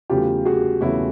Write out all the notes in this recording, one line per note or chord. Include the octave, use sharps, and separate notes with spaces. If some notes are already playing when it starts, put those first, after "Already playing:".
E2 C#3 F#3 A3 F4 G4
F#4 G#4
E2 C#3 F#3 A3 E4 F#4